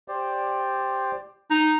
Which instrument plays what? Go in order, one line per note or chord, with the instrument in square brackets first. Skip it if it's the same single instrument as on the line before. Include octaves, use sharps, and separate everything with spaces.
[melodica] G4 C5 D5
[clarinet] D#4